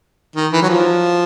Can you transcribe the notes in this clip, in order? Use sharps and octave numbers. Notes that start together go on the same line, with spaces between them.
D#3
E3
F#3
F3